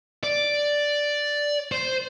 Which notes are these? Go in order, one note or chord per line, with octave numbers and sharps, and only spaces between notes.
D5
C5